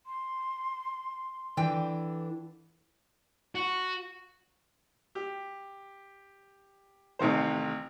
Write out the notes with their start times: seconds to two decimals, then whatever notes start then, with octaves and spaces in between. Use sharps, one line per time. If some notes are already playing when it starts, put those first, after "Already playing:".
0.06 C6
1.57 D3 E3 D4 G5
3.55 F#4
5.15 G4
7.19 A1 C3 D#3 C5